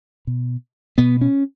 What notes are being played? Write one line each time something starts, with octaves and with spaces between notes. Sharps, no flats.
B2
B2 B3
C#4